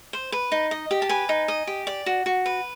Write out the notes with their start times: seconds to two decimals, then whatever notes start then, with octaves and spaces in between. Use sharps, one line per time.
0.13 C5
0.32 B4
0.52 D#4
0.71 D#5
0.91 G4
1.02 A5
1.09 B4 G#5
1.29 D#4
1.48 D#5
1.67 G4
1.87 D5
2.06 F#4
2.26 F#4
2.46 B4